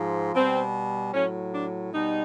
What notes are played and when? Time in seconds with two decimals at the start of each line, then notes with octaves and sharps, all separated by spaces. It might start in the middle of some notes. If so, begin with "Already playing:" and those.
Already playing: G#2 F3
0.35 B2 G3 C4
1.14 A2 F#3 C#4
1.53 D4
1.93 B2 G3 D#4